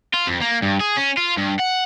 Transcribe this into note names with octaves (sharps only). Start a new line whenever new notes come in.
F4
F2
A#3
G2
G#4
C#4
F4
G2
F#5